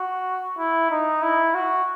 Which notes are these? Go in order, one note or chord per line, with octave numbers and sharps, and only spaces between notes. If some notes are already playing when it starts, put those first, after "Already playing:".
Already playing: F#4
E4
D#4
E4
F#4